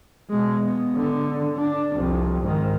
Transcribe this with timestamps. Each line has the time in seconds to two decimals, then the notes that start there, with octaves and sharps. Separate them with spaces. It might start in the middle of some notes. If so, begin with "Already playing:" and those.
0.30 B2 G#3
0.66 B3
0.96 D3
1.57 D4
1.94 C2 F2
2.42 G#2 D#3